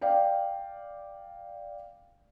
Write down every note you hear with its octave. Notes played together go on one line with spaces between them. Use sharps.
D5 F5 G5